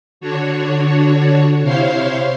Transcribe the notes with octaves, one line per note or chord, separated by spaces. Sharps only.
D3 D4 F#4 C#5
C3 E4 C5 C#5 F5 C6